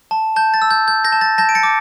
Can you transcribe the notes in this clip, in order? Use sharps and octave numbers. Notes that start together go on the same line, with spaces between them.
A5
A5 G6
A6
E6
G6
G6
G6 A#6
A5
A6
A5 G6 A#6
D7
A6 C#7
D6